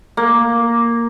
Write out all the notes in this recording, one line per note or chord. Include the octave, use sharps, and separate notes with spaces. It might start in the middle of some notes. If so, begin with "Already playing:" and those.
A#3